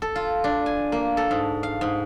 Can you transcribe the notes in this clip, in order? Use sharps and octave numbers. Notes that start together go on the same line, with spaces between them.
A4
F4
D4
G#5
A#3
A4
G#2
F5
G#2